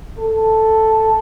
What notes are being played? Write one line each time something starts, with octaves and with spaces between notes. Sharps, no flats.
A4